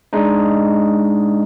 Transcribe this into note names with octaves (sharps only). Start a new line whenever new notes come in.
G#3 D4 D#4